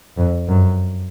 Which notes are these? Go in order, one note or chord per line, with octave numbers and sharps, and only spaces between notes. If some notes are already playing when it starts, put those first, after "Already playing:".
F2
F#2